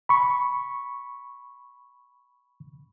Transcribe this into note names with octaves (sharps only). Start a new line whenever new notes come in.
B5 C#6